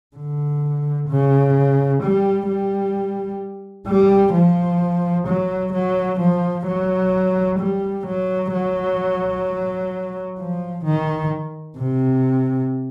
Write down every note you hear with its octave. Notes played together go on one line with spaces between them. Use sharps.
D3
C#3
G3
G3
G3
F3
F#3
F#3
F3
F#3
G3
F#3
F#3
F3
D#3
C3